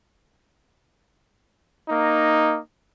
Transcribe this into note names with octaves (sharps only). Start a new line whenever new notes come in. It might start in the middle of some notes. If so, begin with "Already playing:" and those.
A#3 D#4